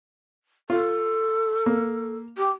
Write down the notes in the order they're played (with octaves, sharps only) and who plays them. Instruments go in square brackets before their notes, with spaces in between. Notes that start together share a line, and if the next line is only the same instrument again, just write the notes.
[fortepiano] F4 [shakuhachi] A4
[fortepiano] A#3
[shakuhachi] G4